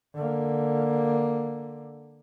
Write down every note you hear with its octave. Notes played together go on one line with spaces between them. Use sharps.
D3 A#3